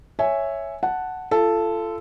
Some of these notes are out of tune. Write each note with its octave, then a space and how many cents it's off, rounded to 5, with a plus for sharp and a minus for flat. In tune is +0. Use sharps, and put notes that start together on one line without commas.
C#5 +0 E5 +0 G#5 +0
F#5 +0 A5 +0
F4 -30 A4 +0